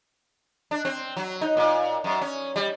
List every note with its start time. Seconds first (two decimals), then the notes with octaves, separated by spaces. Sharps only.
0.71 D4
0.85 C4
1.17 F#3
1.41 D#4
1.57 A#2
2.04 F#2
2.21 C#4
2.56 G3